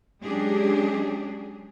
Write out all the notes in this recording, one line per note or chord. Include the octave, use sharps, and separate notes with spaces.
F#3 G#3 C#4 D4 G4 G#4